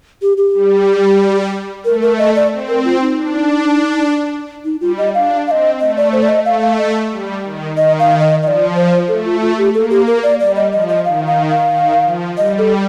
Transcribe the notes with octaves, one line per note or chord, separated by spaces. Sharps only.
G4
G4
G3
A3 A#4
A#4
D#5
D5
C4
A#4
F4
D#4
D4
D#4
G3 F4
D#5
D4 F5
C4 D#5 F5
A3 D#5
D5
C5
D5
D#5
A3 F5
F5
D#5
G3
D#3
D#3 D#5
F5
D#5
F3 D5 D#5
C5
A3 A4
F4
F4
G4
A#3 A4
G4
A#4
D5
G3 D5
D#5
F3 D#5
D#5
D#3 F5
F5
F5
D#3
F3
G3 D#5
A4